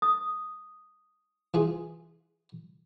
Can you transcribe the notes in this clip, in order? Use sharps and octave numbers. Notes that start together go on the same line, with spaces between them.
D#6
E3 F4 G#4